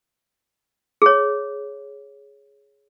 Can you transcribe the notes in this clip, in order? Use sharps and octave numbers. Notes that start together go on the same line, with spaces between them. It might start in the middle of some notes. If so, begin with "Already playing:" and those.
G#4 C#5